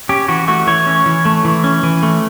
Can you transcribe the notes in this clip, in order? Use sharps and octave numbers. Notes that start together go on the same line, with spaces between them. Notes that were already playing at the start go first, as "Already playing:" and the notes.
C#4 G4
E3 F#4
A3 F#4
E3 C#5
C#4
E3
A3
E3
C#4
E3
A3